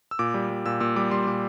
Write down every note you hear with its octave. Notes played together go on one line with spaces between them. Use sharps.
E6
A#2 D6
G3
G3
A#2 E6
A#2 E6
G3 D6
G3 C6
A#2 D6